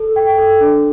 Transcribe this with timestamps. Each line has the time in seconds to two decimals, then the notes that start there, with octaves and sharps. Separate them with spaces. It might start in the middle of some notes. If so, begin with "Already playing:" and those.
Already playing: A4
0.16 G5
0.38 A4
0.60 D4